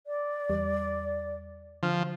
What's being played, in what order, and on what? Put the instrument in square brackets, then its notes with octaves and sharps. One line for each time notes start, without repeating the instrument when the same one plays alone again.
[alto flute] D5
[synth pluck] E2 G3
[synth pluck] D3 F6 [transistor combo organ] F3